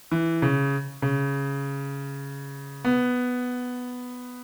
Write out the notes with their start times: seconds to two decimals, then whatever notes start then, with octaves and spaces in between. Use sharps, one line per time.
0.11 E3
0.42 C#3
1.02 C#3
2.85 B3